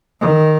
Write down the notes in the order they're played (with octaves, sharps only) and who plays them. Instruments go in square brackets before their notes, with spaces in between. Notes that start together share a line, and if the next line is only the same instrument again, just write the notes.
[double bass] D#3